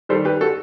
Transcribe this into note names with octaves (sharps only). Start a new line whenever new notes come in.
D#3 G3 A4 C5
G4 B4
F#4 A4